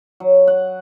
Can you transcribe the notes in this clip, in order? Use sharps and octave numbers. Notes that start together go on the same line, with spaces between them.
F#3
F#5